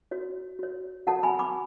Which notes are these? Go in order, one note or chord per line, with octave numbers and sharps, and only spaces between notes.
F#4 C#5
F#4 C#5
F#4 A4 C#5 F#5 A5
G#5 B5
B5 D6